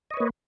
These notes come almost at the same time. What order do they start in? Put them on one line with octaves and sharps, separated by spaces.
D#5 C#5 B4 A#3